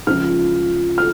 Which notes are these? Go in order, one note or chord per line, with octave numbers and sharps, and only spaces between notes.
C#2 C#3 F3 F6
F6